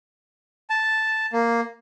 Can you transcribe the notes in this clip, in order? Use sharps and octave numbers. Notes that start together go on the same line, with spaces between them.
A5
A#3